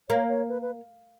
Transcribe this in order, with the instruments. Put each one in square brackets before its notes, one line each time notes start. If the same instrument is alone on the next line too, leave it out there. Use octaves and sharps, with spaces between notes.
[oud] A#3 [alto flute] C#5
[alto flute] C#5
B4
B4